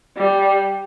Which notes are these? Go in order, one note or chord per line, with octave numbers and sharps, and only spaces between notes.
G3